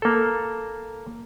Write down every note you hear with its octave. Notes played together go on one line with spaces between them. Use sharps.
A#3 A4